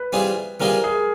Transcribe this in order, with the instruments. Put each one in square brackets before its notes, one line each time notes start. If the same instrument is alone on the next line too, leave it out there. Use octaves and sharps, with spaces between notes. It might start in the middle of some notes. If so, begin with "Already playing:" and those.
Already playing: [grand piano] B4
[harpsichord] E3 G3 C4 F4 G#4
[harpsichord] E3 G3 C4 F4 G#4 [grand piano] A#4
[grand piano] G#4